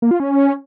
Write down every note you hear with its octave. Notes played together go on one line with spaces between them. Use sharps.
A#3
F4
C#4